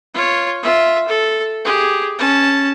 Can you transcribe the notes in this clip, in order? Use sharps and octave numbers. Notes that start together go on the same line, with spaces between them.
F4 C#5
F4 E5
A4
G4 G#4
C#4 A5